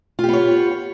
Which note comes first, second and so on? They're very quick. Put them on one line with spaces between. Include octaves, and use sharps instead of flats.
F4 G4 B3 C#5